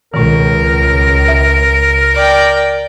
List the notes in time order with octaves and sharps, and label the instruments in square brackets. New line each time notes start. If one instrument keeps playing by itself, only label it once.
[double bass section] C#2 [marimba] B2 D#3 [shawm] A#4
[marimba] E5
[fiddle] D5 G5